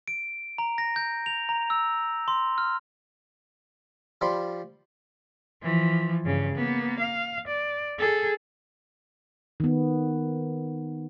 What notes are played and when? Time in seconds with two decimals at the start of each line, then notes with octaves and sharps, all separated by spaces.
0.08 D7
0.58 A#5
0.78 A#6
0.96 G6
1.26 F7
1.49 A#5
1.70 E6
2.28 C6
2.58 F6
4.21 F3 G3 D5 B5 C6
5.62 E3 F3
6.24 G2 C#3
6.55 A#3 B3
6.99 F5
7.48 D5
7.99 G#4 A4
9.60 D#3 B3